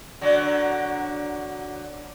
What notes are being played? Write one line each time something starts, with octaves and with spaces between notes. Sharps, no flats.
D3 F#3